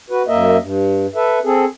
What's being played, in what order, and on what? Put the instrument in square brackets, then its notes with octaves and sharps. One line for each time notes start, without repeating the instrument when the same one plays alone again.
[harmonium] F#4 B4
F#2 A#3 A#4 D#5 E5
G2
A4 B4 E5
C4 G#4 A4